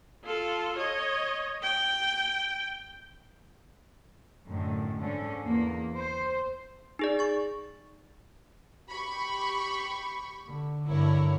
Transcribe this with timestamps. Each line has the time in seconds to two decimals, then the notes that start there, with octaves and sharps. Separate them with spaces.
0.25 F4 A4
0.78 C#5 D#5
1.62 G5
4.47 F#2 A2 D3 D#3
5.00 G#2 D3 C#4
5.44 E2 A#3
5.95 C5
6.99 D#4 G#4 D5
7.19 C#6 A6
8.91 G4 B5 C#6
10.48 D3
10.89 G1 D3 E4 A#4 C#5